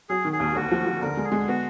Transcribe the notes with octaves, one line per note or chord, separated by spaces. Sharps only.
F#3 G#4
D#3
G#4
D#2
D2 F#4
F3
F3
D3 A#4
G#3
G#4
G#3
B3 F#4